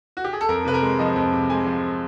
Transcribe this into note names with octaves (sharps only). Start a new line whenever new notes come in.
F#4
G4
G#4
A4
F2 A#4
C3 B4
A#4
G#3
F3 D#5
F2
C3
G#3 G#5
F3